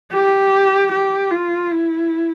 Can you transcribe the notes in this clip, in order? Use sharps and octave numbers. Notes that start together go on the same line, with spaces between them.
G4
G4
F4
E4